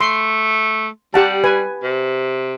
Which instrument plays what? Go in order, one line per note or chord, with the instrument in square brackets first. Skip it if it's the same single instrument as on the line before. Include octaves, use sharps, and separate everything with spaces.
[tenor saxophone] A3 [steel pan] C6
[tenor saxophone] G3 [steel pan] G4 F#5 A5
[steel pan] B4 G#5
[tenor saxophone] C3